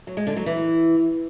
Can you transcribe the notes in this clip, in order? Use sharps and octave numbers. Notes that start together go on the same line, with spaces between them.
F#3
G#3
D3
F#3
E3